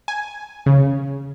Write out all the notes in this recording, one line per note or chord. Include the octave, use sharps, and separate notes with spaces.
G#5
C#3